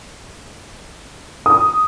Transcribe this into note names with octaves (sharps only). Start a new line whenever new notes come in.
D#6